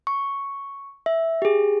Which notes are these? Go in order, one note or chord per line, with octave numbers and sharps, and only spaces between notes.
C#6
E5
G4 G#4